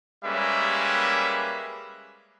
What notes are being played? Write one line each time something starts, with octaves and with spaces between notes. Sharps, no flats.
G3 G#3 A#3 C#4 B4 E5